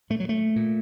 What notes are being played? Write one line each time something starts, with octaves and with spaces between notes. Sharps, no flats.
A#2 A3
F#3
A3
A#2